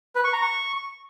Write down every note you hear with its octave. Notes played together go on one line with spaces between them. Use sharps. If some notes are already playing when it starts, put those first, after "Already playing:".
B4
C#6
A#5
C#6